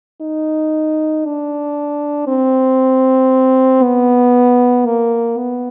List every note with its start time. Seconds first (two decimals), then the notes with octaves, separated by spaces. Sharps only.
0.21 D#4
1.25 D4
2.27 C4
3.82 B3
4.85 A#3
5.37 B3